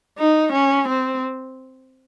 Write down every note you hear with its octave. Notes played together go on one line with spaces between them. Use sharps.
D#4
C#4
C4